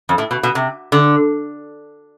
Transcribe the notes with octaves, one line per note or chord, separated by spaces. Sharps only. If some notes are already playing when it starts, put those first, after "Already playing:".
F2
A2
B2
B2
C3
D3